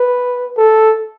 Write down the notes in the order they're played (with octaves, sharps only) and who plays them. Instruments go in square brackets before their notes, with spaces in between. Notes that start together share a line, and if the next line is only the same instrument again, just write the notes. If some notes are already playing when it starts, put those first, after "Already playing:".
Already playing: [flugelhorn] B4
A4